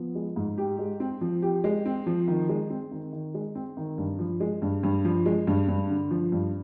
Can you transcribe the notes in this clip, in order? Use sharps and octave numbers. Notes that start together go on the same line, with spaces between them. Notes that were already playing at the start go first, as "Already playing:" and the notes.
Already playing: F3 B3
G#3
G#2
G4
G#3
C4
F3
G4
G#3
C4
F3
D#3
G#3
C4
D#3
D#3
G#3
C4
D#3
G2
F3
G#3
G2
G2
F3
G#3
G2
G2
D3
F3
G2